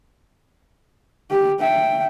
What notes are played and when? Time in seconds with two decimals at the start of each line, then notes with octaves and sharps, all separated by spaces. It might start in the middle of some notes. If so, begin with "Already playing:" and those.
1.31 G4
1.60 E5 G5